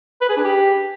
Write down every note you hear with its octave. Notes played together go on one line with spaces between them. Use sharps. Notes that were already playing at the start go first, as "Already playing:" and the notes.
B4
G#4
D4
G4